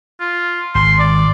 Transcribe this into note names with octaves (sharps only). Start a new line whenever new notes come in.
F4
G#1 C6
D5